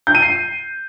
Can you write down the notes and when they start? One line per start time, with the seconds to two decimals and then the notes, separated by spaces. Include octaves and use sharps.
0.07 G6
0.15 D#7
0.22 C7